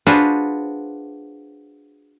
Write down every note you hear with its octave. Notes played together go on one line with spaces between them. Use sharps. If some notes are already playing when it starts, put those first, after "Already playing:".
D4 F4 F#4 G#4 B4 C5